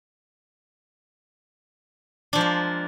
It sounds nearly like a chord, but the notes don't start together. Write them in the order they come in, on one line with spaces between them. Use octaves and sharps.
D4 F3 G#3 A#3